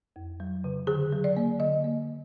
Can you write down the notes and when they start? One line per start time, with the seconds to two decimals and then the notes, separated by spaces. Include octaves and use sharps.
0.16 F2
0.40 F#3
0.64 C#3
0.87 D3 G#4
1.13 F#3
1.24 D5
1.37 A#3
1.60 D3 D#5
1.84 A#3